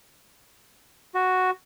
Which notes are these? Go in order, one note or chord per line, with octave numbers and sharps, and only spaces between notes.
F#4